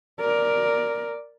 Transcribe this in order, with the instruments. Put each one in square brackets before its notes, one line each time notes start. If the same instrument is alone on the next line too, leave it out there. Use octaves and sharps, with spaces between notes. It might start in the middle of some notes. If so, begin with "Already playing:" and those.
[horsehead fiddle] A#4 D5